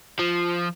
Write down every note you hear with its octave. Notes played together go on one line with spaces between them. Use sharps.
F3